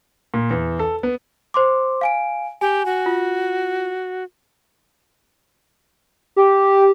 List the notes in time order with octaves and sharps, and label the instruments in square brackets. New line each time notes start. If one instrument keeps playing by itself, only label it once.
[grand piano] A#2
E2
A4
B3
[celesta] C5 C6 D6
F5 G#5 D7
[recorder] G4 [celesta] G#5
[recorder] F#4
[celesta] F4
[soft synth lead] G4